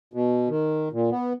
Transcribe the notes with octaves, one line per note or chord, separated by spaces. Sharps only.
B2
D#3
A#2
B3